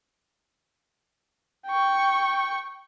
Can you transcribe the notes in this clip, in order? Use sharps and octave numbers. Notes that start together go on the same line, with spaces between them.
G5 C#6